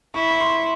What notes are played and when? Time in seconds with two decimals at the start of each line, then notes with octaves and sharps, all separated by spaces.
0.14 E4 C#6
0.31 C#6
0.40 C6